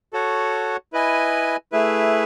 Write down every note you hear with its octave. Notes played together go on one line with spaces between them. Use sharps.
F#4 A4 C#5 F#5
E4 B4 D#5 G#5
A3 E4 G#4 B4 E5